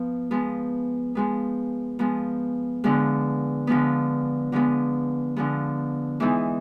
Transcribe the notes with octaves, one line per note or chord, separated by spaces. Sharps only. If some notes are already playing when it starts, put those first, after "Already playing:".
Already playing: F3 B3
F3 G#3 B3
F3 G#3 B3
F3 G#3 B3
D3 F3 G#3 B3
D3 F3 G#3 B3
D3 F3 G#3 B3
D3 F3 G#3 B3
E3 G#3 B3 D#4